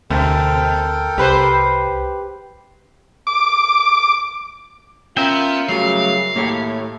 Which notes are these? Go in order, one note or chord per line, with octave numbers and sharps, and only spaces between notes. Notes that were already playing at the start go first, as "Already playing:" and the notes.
D2 B2 A4 A#4 G5
C2 G4 B4 C5
D6
B3 C#4 F4 A#4 E5 G5
C#3 F#3 G3 A3 F5
A2 A#3 G4 C#5